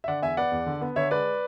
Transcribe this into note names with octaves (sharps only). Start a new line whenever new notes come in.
E5
D3 D5 F#5
E2 E5 G#5
B3 D5 F#5
E2
D3
B3
D3 C#5 E5
G#3 B4 D5